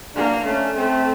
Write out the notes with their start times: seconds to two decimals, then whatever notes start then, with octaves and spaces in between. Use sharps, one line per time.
0.15 A#3 D4
0.45 A3 C#4
0.75 A3 C4